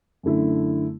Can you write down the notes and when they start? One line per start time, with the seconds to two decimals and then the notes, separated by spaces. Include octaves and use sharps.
0.23 F#2 D3 A3 E4